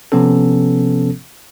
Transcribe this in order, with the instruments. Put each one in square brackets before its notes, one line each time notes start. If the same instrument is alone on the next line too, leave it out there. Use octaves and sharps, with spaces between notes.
[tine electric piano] C3 F3 B3 C#4 A4